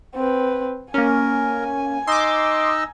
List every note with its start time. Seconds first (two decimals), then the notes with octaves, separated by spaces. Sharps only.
0.15 C4 B4
0.94 A#3 C#4 A#4 G#5
2.07 D#4 D#5 C6 D6 E6